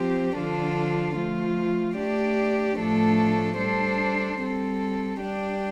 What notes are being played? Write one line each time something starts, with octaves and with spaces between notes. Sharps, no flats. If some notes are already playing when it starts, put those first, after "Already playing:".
Already playing: F3 C4 G4 C5
D3 F3 D4 F4 A4
F3 A3 F4
A3 D4 G4 D5
A2 F3 A3 D4 A4
G3 D4 A4 C5
G3 C4 A4
G3 D4 G4 D5